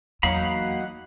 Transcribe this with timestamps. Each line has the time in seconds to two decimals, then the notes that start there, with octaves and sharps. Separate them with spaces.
0.23 E2 F#3 A#3 D#4 F5 F#5 B5